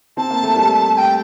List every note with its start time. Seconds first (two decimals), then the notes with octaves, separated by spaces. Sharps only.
0.17 C4 A5
0.30 A#3
0.43 A3
0.56 G3
0.94 A5
0.97 G5